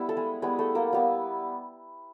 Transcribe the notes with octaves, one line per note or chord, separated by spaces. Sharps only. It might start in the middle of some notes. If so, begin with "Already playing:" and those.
Already playing: G3 B3 E4
A4
G#3 G#4
G3 G#3 B3 E4 G#4
A3 A4
A#3 A#4
G3 B3 E4